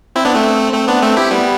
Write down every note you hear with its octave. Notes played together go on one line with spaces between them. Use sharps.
C4 E4
B3 D4
A3 C4
A3 C4
B3 D4
A3 C4
E4 G4
G3 B3